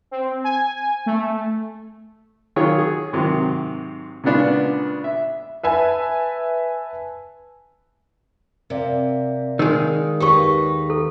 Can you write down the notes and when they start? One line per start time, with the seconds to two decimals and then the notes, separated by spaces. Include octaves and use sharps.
0.11 C4
0.44 G#5
1.06 A3
2.56 D#3 F#3 F4 G#4 C#5
2.78 G#4
3.13 G#2 C3 D#3 F#3
4.24 A#2 C#3 G#3 B3 D4 F5
5.04 E5
5.63 B4 E5 G#5 A5
8.70 C3 A#4 D5 F5
9.59 D#3 G#3 E6
10.20 D#2 D#4 G4 B4 C#6
10.90 A4